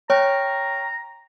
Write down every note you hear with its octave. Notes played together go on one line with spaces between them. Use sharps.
C#5 G5 A#5 C#6 F6